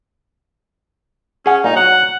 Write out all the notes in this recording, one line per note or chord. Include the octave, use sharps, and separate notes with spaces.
C#4 G#4 F#5
A#2 D#4
F#3 F#5